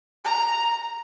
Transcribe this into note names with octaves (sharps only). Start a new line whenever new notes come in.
A#5